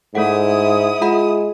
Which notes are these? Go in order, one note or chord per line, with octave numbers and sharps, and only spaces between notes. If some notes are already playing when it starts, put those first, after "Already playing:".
G#2 A3 E4 A4 F#5 D#6
G#3 F4 F#5 B5